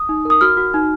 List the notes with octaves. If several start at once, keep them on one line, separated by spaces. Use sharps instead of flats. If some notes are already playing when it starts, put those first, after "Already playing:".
Already playing: D#6
D#4
A#4 D#6
F#4 F6
F#4
D#4